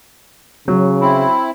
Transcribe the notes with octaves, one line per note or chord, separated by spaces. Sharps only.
C#3 F#3
C4 E4